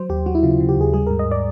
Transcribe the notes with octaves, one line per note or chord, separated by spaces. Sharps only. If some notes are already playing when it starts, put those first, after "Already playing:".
Already playing: F#3 C5
D#2 G4
F#3 F#4
E4
C#3 F4
C#3
G4
D#2 G#4
G3 G#4
G#2 A#4
D#5
D5